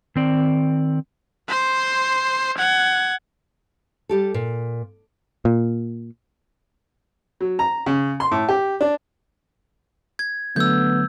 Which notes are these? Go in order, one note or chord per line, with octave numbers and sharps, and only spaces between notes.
D#3 C4 D5
C5 C6
F#5 G#6
G3 G4 A4
A#2
A#2
F#3
A#5
C#3
C6
A2
G4
D4
G#6
D3 F#3 A3 B3 E6 G6